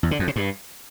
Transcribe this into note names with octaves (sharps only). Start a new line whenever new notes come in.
E2
D3
F2
C#3
G2